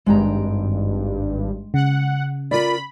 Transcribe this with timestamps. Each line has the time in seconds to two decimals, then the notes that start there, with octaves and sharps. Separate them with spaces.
0.06 G#1 G2 G#3 G5 A#5
1.74 C#3 F#5
2.51 F4 A#4 D5 B5